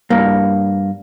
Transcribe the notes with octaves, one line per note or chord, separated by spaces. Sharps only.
G2 A#3